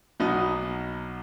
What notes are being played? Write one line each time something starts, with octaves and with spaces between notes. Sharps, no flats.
B1 B2 B3 D#4